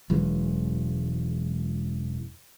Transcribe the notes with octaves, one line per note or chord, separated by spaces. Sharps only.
E1 F#2 E3 G#3